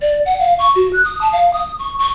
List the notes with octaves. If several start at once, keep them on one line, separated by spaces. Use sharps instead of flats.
D5
F#5
F5
C#6
F#4
F#6
D#6
A5
F5
D#6
C#6
C#6